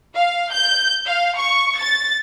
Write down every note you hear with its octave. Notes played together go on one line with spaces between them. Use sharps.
F5
G6
F5
C#6
A6